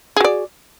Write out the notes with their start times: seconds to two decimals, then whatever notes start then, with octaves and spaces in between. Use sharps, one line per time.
0.16 G#4
0.20 F#4
0.24 D5